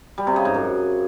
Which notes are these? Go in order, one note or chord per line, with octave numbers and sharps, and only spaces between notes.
G3
C3
C#3
G#2
F#2